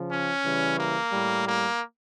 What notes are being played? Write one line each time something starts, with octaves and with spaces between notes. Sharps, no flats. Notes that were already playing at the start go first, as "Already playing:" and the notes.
Already playing: C#3 F3
C#4
C#3 E3 G3
A#3
A2 G3
A#3